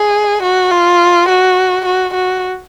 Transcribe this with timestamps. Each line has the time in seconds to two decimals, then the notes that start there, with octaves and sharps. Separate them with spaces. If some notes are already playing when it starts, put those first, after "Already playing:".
Already playing: G#4
0.43 F#4
0.71 F4
1.29 F#4
1.86 F#4
2.14 F#4